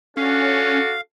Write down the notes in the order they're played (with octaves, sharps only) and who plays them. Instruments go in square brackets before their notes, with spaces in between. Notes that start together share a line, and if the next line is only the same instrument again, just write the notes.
[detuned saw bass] C#4 [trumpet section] D4 F#4 [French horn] A4 [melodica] F5